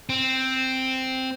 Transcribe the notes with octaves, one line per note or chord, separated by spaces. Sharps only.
C4